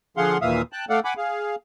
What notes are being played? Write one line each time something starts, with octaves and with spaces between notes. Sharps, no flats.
D3 F3 G#4 F5 F#5 C6
D#2 A#2 E3 E5 F5 D#6
G5 A5 F#6
A3 A4 D5 F5 F#5
F#5 G#5 B5 D6
G#4 F5